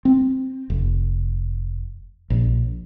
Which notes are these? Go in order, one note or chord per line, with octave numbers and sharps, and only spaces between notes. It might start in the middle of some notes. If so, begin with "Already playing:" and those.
C4
F1
A#1